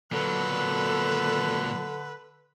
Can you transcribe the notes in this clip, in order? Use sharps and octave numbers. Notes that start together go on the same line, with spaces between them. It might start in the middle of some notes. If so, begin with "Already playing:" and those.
A#2 D3 F#3 A4 B4